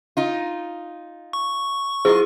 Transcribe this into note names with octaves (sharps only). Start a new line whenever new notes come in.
D#4 F4
C#6
F#3 E4 F4 G#4 D#5